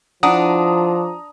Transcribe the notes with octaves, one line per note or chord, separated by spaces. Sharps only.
F3 D4 E4 F#5 A#5 D#6